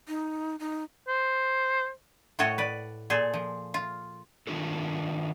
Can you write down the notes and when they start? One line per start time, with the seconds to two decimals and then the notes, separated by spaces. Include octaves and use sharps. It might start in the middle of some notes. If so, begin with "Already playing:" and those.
0.08 D#4
0.59 D#4
1.08 C5
2.39 A2 F#4 A4 C#5 D#5 A5
2.58 B4 D5
3.10 A#2 G#4 A4 C5
3.34 F3
3.74 F4
4.47 D#3 D4 F4 A4